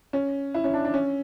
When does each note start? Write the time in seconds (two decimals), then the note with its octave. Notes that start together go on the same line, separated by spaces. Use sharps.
0.13 C#4
0.54 E4
0.64 C#4
0.73 D4
0.85 D4
0.94 C#4